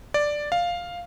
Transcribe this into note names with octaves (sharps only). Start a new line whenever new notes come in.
D5
F5